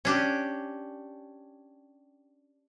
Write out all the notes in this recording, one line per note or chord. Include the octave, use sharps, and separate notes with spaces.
C#4 D4 G4